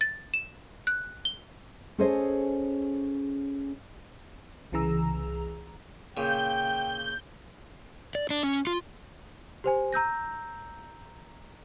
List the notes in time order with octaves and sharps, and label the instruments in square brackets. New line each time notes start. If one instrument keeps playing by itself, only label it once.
[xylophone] A6
E7
F#6
G7
[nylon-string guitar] C#4 G#4 A4 C5 C#5 D#5
[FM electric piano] C2 C#3 E3 G#4 A#5 E6
[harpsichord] A#2 C#3 [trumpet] G5 [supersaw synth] G6
[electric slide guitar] D5
D4
C#4
F4
[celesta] G4 C5 G#5
A#5 E6 G6 A#6